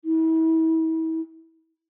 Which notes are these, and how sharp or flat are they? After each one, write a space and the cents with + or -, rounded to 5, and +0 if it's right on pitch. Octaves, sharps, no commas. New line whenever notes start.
E4 -35